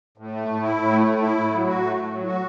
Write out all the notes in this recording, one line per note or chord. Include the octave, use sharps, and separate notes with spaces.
A2
A3
A2
E4
A2
A3
A2
E4
A2
F#3
F#4
A3
A2
F#3
F#4